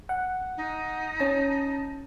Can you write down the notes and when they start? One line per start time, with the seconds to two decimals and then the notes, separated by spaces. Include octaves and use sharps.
0.09 F#5
0.57 D#4
1.20 C#4 A5